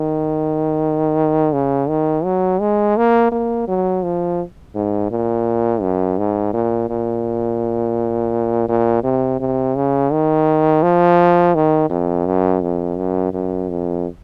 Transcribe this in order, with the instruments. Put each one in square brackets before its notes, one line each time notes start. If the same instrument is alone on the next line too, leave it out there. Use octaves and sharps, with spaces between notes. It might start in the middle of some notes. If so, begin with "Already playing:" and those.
Already playing: [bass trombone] D#3
C#3
D#3
F#3
G#3
A#3
A#3
F#3
F3
G#2
A#2
F#2
G#2
A#2
A#2
A#2
C3
C3
C#3
D#3
F3
D#3
F2
F#2
F2
F#2
F#2
F2